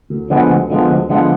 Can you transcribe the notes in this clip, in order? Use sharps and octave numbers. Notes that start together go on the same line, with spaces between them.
D2
D3 F3 G#3 B3
D2
D3 F3 G#3 B3
D2
D3 F3 G#3 B3